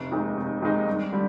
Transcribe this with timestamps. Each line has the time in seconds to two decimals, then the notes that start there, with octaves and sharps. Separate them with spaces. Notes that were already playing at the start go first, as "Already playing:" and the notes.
Already playing: F1
0.12 D#2 D#3 G#3 D#4
0.37 F1
0.62 D#2 D#3 G#3 D#4
0.87 G2
1.13 D3 G3